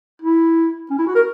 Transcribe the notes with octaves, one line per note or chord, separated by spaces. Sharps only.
E4
C#4
E4
F#4
A#4